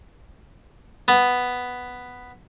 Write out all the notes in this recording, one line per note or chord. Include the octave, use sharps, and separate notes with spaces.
B3